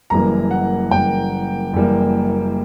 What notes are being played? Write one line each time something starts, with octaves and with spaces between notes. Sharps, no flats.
F#1 F#2 E3 G3 A#3 A#5
F#5
F#1 F#2 E3 G3 A#3 G5
F#1 F#2 E3 G3 A#3